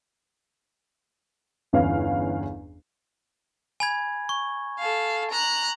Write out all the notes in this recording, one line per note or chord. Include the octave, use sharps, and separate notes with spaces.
G1 E2 C#4 B4 F5
G#5 B5 G#6
C#6
A4 F5
A#5 F#6